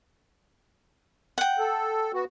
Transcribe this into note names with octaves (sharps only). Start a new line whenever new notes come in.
F#5 G5
A4
B3 F#4